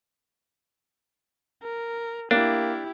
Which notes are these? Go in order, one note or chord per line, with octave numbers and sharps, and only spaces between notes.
A#4
A#3 D4 E4 G4